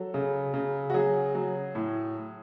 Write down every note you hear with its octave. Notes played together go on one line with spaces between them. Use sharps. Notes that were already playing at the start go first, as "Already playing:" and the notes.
Already playing: F#3 A4
C#3
C#3
F#4
F#3 G#4
F#3
A2